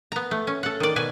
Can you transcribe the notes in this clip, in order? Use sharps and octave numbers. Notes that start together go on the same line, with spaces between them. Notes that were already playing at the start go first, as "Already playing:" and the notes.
B3 A#5
A3
C#4
A4 F#5
D#3 D5
B2 B4 G#5